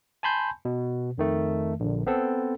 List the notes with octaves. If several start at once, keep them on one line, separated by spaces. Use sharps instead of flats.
G#5 A5 B5 C6 G6
B2
F2 D#3 A3
A#1 D3
B3 C4 A4